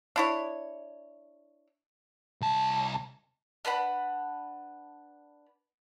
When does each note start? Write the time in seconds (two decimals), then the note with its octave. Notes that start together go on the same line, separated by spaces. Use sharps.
0.16 D4 E4 C#5
2.41 C2 A5
3.65 D4 B4 F#5 B5